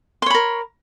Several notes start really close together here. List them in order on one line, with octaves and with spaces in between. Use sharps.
C6 C#5 B5 A#4